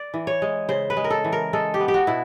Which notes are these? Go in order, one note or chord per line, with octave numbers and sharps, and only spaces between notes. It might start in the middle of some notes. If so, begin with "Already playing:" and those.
Already playing: D5
E3
C#5
G#3
C#3 C5
B4
G#3
A#4
A4
E3
A#4
G#3 A4
G4
B3
G4
F#4
B2 E4